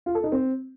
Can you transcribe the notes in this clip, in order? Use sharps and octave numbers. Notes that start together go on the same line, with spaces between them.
F4
A4
D#4
C4